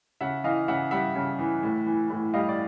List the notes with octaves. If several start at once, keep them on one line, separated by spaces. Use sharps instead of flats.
C#3 E5 F#5
E3 D#5 F5
C#3 E5 F#5
G3 E5 F#5
C#3
E3
A2
E3
A2
G3 D#5 F5
D5